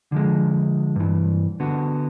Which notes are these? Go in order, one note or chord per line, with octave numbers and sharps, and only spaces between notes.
D3 F3 G#3
G2 E3
D3 B3 F#4